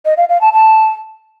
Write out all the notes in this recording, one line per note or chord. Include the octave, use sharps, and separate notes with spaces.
D#5
F5
F5
A5
A5